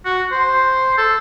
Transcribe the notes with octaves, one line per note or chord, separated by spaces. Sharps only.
F#4
C5
A4